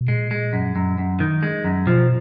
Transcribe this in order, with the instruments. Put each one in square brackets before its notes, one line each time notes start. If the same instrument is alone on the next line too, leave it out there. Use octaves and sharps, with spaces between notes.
[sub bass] B2
[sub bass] A#2 [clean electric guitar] G#3
[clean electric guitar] G#3
F#2
F#2
F#2
D#3
G#3
F#2
[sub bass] B2 [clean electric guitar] F3